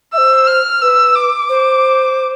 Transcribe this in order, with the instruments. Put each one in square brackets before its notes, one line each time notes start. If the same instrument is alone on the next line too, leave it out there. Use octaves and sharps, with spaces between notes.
[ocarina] C5 E5 [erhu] E6
[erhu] F6
[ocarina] B4 [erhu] E6
[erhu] D6
[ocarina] C5